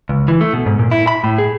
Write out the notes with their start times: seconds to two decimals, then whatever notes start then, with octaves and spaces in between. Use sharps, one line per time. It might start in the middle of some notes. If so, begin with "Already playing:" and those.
0.09 C#2
0.28 E3
0.41 A3
0.53 B2
0.66 G#2
0.79 A#2
0.91 E4
1.07 B5
1.24 A2
1.38 G#4